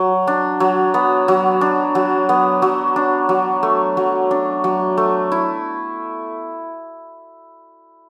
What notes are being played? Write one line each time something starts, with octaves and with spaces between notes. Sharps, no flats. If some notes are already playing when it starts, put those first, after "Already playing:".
Already playing: F#3
D4
F#3
B3
F#3
D4
F#3
B3
F#3
D4
F#3
A3
F#3
D4
F#3
A3
E4